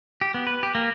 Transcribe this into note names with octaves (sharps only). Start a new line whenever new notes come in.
G4
B3
B4
G4
A#3